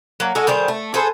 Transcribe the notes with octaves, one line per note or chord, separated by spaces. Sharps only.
F#3 A#3
G#3 F#4 G#4 A4
D#3 G3 G#4 C5
A3
G#4 A4 B4 C5